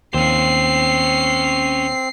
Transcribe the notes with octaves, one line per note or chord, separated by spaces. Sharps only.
D#2 C4 C#4 C5 C7